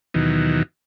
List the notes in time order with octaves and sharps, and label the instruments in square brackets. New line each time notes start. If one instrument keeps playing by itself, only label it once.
[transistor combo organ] D#2 B2 D#3 E3 F#3